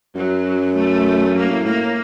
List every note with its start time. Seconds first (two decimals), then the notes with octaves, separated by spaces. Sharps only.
0.16 F#2 F#3
0.75 A3
1.34 F#2 A#3
1.50 A2
1.65 A2 A#3